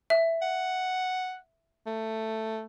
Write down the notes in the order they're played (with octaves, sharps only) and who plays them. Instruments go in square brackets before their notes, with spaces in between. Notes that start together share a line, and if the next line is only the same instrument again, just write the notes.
[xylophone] E5
[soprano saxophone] F#5
A3